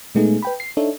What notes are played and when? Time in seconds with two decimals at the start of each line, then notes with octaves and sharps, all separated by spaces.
0.15 A#2 G#3 A3 B3 D#4 G#4
0.42 B4 G5 B5
0.60 C7
0.77 D4 D#4 A4 C#5 E5